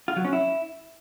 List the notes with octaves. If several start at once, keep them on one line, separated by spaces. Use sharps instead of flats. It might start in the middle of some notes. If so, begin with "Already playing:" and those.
F4
F#3
C#4
E4